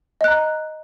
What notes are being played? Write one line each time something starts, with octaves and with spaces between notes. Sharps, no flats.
D#5 A#5 F#6